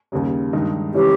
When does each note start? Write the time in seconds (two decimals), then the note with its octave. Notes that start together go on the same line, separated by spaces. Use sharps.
0.12 D#2 C#3 G3
0.53 G2 D#3 G#3 D#4
0.94 C#3 E3 G#3 C#4 G4